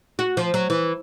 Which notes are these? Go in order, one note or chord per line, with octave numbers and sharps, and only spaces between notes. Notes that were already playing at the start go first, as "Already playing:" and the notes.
F#4
F3
F#3
E3